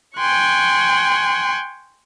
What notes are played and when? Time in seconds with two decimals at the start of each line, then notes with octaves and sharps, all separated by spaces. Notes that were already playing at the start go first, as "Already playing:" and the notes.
0.17 G5 G#5 C6 C#6 F#6